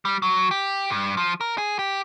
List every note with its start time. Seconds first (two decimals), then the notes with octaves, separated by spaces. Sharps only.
0.05 G3
0.22 F#3
0.51 G4
0.90 G2
1.17 F3
1.41 A#4
1.58 G#4
1.79 G4